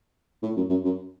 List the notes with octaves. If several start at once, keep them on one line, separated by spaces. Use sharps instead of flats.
A2
F#2
F#2
F#2